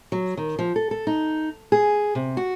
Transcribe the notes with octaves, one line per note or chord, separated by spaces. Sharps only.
F#3
D#3
F3
A4
A4
D#4
G#4
C3
F#4